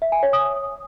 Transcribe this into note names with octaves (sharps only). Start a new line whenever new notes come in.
E5
G#5
C#5
D#6